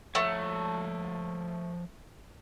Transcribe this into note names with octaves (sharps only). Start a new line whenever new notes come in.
F3 A3 C#5